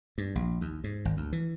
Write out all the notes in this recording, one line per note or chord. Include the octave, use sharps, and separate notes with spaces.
G2
A#1
D#2
G#2
G#1
D2
E3